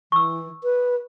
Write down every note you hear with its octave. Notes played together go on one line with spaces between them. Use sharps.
E3 C#6 E6
B4